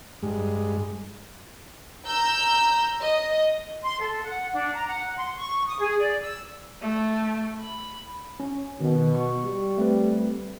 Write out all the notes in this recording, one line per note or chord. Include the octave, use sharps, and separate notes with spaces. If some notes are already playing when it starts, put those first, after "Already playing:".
G2 G#3
A#5 E6 G6
D#5
C6
A4
F#5
D4
A#5
F#5
C6
C#6
D#6
G#4
D5
E6
A3
B5
C#4
B2 D#3
C#6
G3
A3 C4 B4